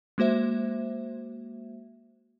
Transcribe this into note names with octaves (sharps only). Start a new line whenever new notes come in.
G#3 A#3 F#4 C5 E5